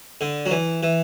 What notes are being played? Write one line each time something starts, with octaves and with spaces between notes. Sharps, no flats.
D3
F#3
E3
E3